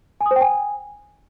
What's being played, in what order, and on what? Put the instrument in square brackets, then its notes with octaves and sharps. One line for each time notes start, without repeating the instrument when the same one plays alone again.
[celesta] G#5
D#6
C5
G5
G#5